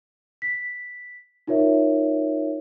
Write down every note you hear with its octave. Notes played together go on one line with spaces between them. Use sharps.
B6
D#4 F4 A#4 C#5 E5